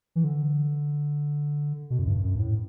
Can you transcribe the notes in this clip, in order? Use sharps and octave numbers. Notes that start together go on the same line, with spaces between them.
E3
D3
B2
F#2
G2
F#2
G2
A2